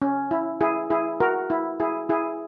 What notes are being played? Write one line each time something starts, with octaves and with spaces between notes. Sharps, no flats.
C#4
E4
E4 G#4
E4 G#4
F#4 A#4
E4
E4 G#4
E4 G#4